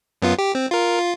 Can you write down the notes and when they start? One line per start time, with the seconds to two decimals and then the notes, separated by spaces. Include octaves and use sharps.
0.22 F#2 B3 F4
0.38 G4
0.55 C4
0.71 F4 A#4
0.99 F4